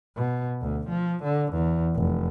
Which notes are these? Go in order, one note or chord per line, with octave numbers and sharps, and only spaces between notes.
B2
D2
F3
D3
E2
F1